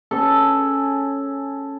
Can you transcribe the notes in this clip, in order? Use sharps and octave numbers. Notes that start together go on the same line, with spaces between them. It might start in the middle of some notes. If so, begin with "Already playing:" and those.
C#4 A4